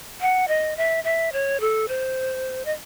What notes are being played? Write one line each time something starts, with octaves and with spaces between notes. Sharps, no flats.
F#5
D#5
E5
E5
C#5
A4
C5
D#5